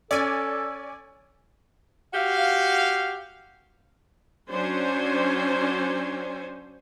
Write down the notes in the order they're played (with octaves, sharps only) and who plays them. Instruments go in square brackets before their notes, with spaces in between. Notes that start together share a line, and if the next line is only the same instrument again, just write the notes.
[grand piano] C#4 [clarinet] A4 [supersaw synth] D5 G#5
[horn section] F#4 G4 F5
[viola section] F#3 C#4 D4 C5 G#5